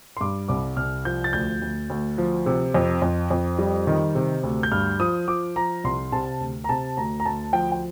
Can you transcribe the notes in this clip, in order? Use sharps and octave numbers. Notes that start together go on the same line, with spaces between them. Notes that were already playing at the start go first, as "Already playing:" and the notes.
C6
G2 D6
C2 D6
C2 F6
F3 G6
A6
D2 G6
D2
D2
F3
C3
F2
F2
F2
G3
D#3
C3
D2
G6
G2 F6
F3 D#6
F3 D6
F3 A#5
C2 C6
C3 A5
D2
A#5
C3 A5
D2 A#5
A#5
D2 A5
F3 G5
G5